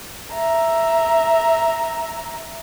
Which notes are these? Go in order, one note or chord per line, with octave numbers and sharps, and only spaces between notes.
E5 A#5